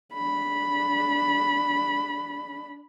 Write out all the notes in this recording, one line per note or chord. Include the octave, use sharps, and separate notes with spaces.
D4 B5